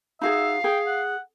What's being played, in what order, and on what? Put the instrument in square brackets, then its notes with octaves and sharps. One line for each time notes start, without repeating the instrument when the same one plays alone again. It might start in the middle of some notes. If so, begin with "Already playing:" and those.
[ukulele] D#4 F#4 G#4 [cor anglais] E5 [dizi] F5
[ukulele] G#4 [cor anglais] G5
[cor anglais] F#5